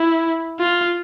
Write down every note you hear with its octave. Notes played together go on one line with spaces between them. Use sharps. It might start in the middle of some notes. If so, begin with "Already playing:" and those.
Already playing: E4
F4